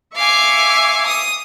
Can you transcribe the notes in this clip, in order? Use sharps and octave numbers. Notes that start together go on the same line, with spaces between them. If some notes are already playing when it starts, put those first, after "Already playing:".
E5 F5 G#5 C#6 D6
D#6